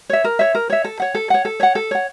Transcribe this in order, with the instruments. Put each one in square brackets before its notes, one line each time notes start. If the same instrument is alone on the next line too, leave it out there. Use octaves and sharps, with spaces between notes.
[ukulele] C#5 E5
A#4
C#5 E5
A#4
C#5 E5
A4
C#5 F#5
A4
C#5 F#5
A4
C#5 F#5
A4
C#5 F#5